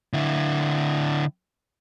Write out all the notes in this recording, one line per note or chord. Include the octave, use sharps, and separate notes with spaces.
D3 E4